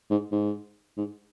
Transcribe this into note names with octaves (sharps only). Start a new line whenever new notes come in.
G#2
G#2
G#2